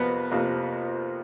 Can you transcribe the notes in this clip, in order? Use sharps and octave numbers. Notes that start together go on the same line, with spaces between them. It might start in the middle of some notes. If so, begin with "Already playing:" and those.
Already playing: F2 C3 F3 A#3 B3 B4
F2 C3 F3 A#3